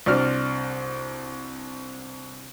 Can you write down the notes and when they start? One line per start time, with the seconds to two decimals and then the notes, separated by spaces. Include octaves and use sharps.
0.06 C2 D4 F#4 F6